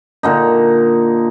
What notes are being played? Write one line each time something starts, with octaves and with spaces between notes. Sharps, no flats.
A#2 D3 D#4